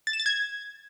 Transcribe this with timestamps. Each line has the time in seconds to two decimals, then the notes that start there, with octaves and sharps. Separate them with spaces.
0.07 A6
0.13 E7
0.20 A6
0.26 G#6